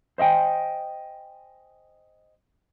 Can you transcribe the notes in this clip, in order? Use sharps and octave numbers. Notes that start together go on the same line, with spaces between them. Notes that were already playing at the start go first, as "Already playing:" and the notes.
C5 D#5 E5 G5 G#5